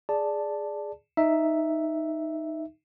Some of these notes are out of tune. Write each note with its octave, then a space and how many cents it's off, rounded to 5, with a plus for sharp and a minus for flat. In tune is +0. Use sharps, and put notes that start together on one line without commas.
G#4 +0 D5 +0 A5 +0
D#4 +0 E5 +0